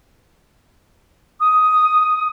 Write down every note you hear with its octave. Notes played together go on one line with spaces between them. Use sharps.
D#6